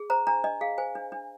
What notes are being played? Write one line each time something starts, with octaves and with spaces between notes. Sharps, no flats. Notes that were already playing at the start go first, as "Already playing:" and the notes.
Already playing: G#4
C5 A#5
D4 A#5
D4 D#5
G#4 F5
C5 G#5
D4
D4